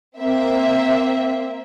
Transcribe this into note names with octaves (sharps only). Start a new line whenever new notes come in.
A#3 C4 E5